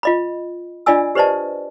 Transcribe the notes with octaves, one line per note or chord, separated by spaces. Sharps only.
F4 D#5 B5
D4 F4 D5 D#5 G#5 E6
G4 B4 C5 D5 D#5 A5